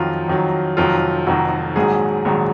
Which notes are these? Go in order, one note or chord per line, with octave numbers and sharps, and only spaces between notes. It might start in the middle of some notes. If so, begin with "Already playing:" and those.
Already playing: F2 D#3 F#3 F4
F2 D#3 F#3
F1 F2 D#3 F#3 F4
F1 F2 D#3 F#3 F#4
A#1 G#2 D#3 F#3 G#4
A#1 G#2 D#3 F#3